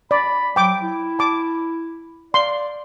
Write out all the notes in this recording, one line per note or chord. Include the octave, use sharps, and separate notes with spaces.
D5 B5
F#3 G5 D6
E4
A5 D6
D5 C6